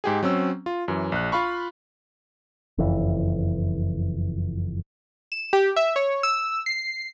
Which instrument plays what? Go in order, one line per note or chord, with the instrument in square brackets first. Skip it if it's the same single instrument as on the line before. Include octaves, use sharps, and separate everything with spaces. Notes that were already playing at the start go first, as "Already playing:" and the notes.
[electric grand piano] G#2 G4 G#4
F#3 C4 C#4 E6
F4
F#2 E3
A#1 F#6
F4 F5 B5 C#6
[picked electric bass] F#1 F2 E3
[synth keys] E7
G4
E5
C#5
E6
C7